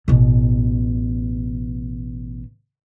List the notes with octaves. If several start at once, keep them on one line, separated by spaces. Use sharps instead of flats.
A1 B2